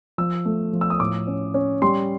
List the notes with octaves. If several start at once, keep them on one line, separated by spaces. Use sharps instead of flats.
F3 E6
A3
F3
E6
D#6
A2 D6
C#4
C#4
G3 C6